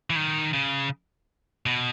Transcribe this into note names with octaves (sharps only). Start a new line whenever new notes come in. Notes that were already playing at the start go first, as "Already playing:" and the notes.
E3
D#3
C#3
B2